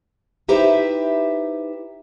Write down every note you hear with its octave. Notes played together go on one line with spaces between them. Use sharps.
D#4 E4 G4 B4 C5 E5